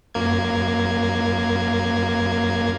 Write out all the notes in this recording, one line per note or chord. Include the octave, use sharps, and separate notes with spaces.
F#2 A#3 G#6